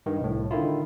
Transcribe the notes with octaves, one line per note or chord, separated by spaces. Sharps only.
G2 D#3
C2 A2
D3 D#3 E4 F4